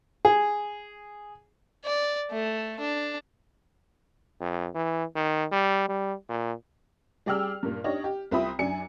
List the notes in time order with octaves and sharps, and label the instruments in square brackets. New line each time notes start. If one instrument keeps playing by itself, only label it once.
[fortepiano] G#4
[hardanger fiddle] D5
A3
D4
[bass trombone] F2
E3
D#3
G3
G3
A#2
[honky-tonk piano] G3 G#4 D5 G5 E6 F6
G2 A#2
D4 D#4 G4 C#5 D#5
G4
C2 C4 F4 E5 B5 D#6
F#2 D4 G#5 C#7